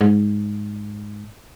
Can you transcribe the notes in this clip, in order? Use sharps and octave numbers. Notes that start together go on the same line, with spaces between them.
G#2